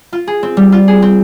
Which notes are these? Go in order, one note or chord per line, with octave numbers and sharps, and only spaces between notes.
F4
G#4
C4
G3
F4
G#4
C4